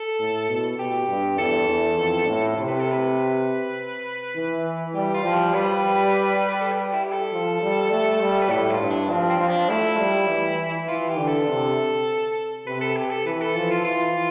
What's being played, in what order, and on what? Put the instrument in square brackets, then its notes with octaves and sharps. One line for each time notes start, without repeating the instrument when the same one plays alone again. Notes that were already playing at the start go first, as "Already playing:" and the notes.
Already playing: [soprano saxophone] A4
[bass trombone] A2
B2
[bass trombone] B2 [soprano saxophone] G4
[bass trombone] G2
[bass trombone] E2 [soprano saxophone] A4
[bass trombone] E2
F2
A2
C3
[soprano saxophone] B4
A4
B4
[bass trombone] E3
[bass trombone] G3 [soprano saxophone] G4
[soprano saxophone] F4
[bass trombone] F3
[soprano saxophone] G4
[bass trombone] G3 [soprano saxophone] B4
[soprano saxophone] B4
A4
G4
E4
G4
A4
[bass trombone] F3
G3
A3
G3
[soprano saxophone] B4
[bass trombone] A2 [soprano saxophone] A4
[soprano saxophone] F4
[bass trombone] G2
[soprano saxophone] D4
[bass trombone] F3 [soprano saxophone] C4
[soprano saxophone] C4
[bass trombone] F3 [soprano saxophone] C4
[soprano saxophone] D4
[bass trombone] A3 [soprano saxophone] E4
[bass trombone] G3
E3
[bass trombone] E3 [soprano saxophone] F4
[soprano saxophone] G4
[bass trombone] D3
[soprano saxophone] A4
[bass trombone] C3
[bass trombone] C3 [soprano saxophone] B4
[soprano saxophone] A4
G4
A4
[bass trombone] E3 [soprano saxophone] B4
[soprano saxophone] A4
[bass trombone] F3 [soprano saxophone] A4
[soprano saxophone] F4
[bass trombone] E3 [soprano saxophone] F4